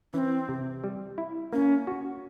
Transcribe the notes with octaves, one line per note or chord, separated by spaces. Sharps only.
E3 C4 C#4
C3
G3
E4
A#3 C#4
F#4